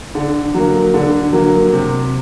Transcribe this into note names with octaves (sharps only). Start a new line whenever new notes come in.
D3
F#3 A#3
D3
F#3 A#3
C3